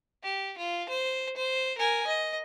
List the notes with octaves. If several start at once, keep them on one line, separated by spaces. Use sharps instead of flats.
G4
F4
C5
C5
A#4 G#5
D#5